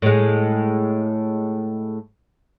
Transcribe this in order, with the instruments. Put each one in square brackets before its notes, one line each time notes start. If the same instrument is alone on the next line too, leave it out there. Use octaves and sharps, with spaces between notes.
[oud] A2 G#3